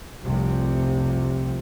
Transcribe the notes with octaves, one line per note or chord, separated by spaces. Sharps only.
F1 C2 C3